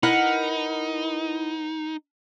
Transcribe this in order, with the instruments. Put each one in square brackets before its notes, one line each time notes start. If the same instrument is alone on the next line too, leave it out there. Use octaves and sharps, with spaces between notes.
[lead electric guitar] D#4 [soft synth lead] E4 [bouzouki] A#4 B4 F#5